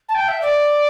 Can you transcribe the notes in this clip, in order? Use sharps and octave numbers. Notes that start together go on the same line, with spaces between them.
A5
G5
E5
D5